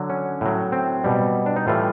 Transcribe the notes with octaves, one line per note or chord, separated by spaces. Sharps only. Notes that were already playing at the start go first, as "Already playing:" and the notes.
Already playing: D3 F#3
C#4
A2 F#3
C4
B2 G3
D4
D#4
A2 E3 G3 F4